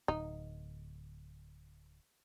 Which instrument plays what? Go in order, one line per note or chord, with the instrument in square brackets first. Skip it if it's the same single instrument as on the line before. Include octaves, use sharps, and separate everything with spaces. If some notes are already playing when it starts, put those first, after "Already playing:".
[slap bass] D1 [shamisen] D#4